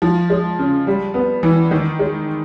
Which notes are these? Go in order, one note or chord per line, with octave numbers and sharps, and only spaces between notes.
F3
G#3
C#3
G3
B3
E3
D#3
G#3